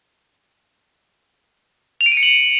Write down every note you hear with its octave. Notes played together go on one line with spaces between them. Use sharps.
F7
D7
D#7
C#7
F#7